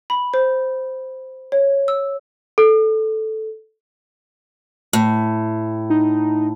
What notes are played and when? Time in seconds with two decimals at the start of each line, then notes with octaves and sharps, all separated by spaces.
0.10 B5
0.34 C5
1.52 C#5
1.88 E6
2.58 A4
4.93 A2
5.90 D#4